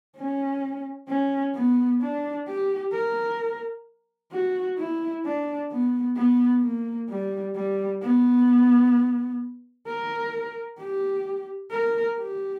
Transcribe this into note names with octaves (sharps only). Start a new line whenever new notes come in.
C#4
C#4
B3
D4
G4
A#4
F#4
E4
D4
B3
B3
A#3
G3
G3
B3
A#4
G4
A#4
G4